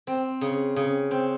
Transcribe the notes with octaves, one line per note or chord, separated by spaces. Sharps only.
C4
C#3
C#3
C4